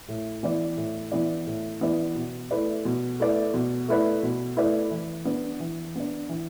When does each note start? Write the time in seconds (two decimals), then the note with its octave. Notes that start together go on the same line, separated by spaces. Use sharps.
0.08 A2
0.43 E3 B3 E4 D5
0.77 A2
1.12 E3 B3 E4 D5
1.47 A2
1.81 E3 B3 E4 D5
2.15 B2
2.51 A3 E4 B4 D5
2.85 B2
3.20 A3 E4 B4 D5
3.54 B2
3.88 A3 E4 B4 D5
4.23 B2
4.57 A3 E4 B4 D5
4.91 E3
5.25 B3 D4
5.60 E3
5.96 B3 D4
6.29 E3